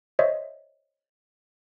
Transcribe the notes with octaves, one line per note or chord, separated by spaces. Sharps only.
C5 C#5 D#5 E5